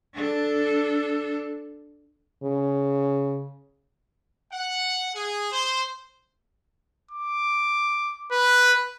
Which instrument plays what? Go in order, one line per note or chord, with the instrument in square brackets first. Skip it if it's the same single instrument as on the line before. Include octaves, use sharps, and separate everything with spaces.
[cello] D4 A4
[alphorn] C#3
[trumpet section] F#5
G#4
C5
[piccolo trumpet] D6
B4